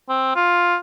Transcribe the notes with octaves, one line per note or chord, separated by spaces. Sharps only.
C4
F4